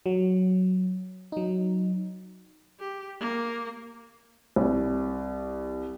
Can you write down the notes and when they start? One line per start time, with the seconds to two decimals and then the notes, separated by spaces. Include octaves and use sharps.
0.06 F#3
1.32 F#3 D#4
2.80 G4
3.20 A#3
4.56 C2